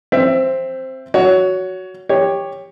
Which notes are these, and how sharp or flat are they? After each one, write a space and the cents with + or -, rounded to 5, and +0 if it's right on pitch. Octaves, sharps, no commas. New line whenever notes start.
C4 +5 C5 +0 E5 +20
F#4 +0 C#5 +20
G4 +15 C#5 +0